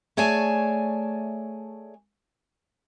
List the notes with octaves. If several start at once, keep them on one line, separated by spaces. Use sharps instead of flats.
A3 G#4 C#5 D5 G#5 A5